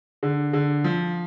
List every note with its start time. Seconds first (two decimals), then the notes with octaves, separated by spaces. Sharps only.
0.23 D3
0.53 D3
0.84 F3